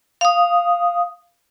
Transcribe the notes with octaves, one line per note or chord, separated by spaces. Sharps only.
F5 D#6